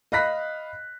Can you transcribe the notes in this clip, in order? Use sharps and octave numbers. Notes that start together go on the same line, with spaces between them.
D#5 F5 B5 F#6 A#6 B6